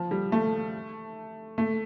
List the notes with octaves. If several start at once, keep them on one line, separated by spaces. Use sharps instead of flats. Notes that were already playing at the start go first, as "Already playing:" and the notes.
Already playing: F3
G3
A3
A3